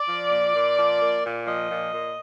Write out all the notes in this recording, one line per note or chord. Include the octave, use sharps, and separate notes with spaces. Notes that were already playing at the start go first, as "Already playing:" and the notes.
Already playing: D5
F3
A#2
A#2
F3
A#3
A#2
F3 D#5
A#2
A#2